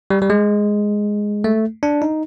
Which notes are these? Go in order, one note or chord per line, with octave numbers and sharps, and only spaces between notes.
G3
G3
G#3
A3
D4
D#4